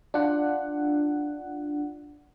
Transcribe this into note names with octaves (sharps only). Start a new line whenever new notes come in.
D4 F4 F#5